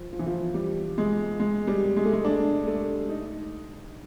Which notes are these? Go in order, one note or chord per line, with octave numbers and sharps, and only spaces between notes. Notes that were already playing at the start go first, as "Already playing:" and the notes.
Already playing: F3
F3
E3
F3
G3
G#3
G#3
G3
G#3
A3
G#3
D4
A3
D#4